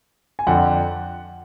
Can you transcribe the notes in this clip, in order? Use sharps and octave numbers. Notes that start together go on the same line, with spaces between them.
G#5
F2 D3 F3 F#5